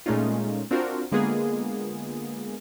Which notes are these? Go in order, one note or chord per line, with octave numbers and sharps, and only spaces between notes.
A#2 G#3 A3 C#4 D#4 F4
C4 D4 F4 F#4 A#4 C5
D3 G#3 A#3 B3 F4 G#4